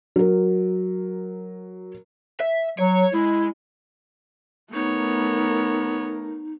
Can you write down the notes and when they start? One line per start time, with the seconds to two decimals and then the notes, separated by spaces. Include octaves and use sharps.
0.16 F#3 A#4
2.40 E5
2.78 F#3 C#5
3.14 G#3 E4
4.73 A3 B3 D#4 A#4 C#5